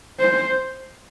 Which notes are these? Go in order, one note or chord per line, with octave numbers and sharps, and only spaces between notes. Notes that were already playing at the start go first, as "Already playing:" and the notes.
C5